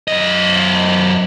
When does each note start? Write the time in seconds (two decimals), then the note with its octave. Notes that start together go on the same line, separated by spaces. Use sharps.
0.08 F#2 D#5